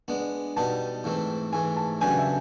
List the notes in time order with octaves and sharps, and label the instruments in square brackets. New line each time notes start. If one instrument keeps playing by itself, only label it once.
[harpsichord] G#3 B3 D4
[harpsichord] B2 G3 B3 D#4 [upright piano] A5
[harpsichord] G#2 E3 A3 C4
[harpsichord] G#2 E3 A3 [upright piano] G#5
[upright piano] A5
[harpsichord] C#3 F#3 B3 D4 G4 [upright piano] G#5
[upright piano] E5